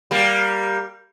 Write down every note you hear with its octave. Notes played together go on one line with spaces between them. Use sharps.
G3 A#3